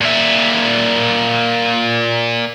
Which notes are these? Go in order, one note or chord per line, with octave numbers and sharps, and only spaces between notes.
A#2 E5